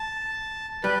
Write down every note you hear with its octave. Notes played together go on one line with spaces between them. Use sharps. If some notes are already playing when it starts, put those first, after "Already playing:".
Already playing: A5
G3 B4